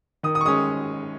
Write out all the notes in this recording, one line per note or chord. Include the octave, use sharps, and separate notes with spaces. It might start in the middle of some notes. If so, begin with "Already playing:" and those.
D#3 D#6
D#6
C#6
G#3 C#4 D#6